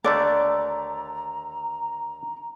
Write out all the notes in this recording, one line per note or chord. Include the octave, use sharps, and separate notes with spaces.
D#2 D3 A3 D5 A#5